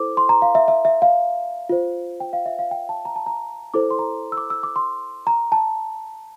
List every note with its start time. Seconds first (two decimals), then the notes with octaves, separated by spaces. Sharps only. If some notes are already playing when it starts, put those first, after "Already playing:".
Already playing: E4 A4 C5 D6
0.17 C6
0.29 A#5
0.42 F5
0.55 E5
0.68 E5
0.85 E5
1.02 F5
1.69 F4 C5
2.20 G5
2.33 F5
2.46 E5
2.59 F5
2.71 G5
2.89 A5
3.05 A#5
3.16 A5
3.26 A#5
3.74 E4 A4 C5 D6
3.91 C6
3.99 A#5
4.32 E6
4.37 D6
4.50 E6
4.63 D6
4.76 C6
5.27 A#5
5.52 A5